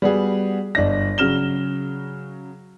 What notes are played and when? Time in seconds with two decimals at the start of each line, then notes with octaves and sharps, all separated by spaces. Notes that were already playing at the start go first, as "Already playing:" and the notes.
0.02 G3 B3 F#4 G#4
0.75 G1 D4 D#5 A#6
1.18 C#3 F#3 F6 E7 G7